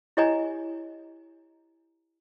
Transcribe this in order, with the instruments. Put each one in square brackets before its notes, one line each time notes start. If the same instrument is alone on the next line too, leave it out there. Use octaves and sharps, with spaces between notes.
[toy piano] E4 G4 C#5 D#5 G#5 A#5